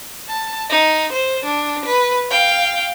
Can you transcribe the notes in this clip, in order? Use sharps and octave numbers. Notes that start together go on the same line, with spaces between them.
A5
D#4
C5
D4
B4
F5 G5